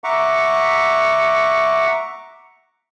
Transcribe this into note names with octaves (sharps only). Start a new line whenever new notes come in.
E5 F#5 A#5 C#6 D6